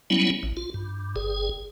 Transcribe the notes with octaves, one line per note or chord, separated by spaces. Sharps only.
F#3 G3 B3 C#4 E4
A1
F4
G2
G1 G#4